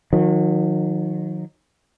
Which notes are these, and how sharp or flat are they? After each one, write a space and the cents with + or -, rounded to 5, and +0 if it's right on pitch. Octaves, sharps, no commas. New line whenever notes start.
D#3 +0 F#3 -40